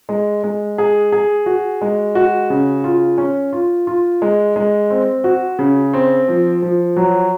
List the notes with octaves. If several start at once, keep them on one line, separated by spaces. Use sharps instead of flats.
G#3
G#3
G#4
G#4
F#4
G#3
F#4
C#3
F4
C#4
F4
F4
G#3
G#3
C4
F#4
C#3
C4
F3
F3
F#3